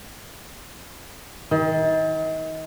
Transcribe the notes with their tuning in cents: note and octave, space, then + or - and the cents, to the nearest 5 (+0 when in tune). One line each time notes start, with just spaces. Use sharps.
D#3 +35